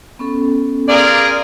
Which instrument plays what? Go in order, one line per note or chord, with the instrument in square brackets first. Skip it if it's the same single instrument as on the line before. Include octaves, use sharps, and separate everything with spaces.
[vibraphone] B3 C#4 A4
[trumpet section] F4 G#4 A#4 [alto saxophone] D5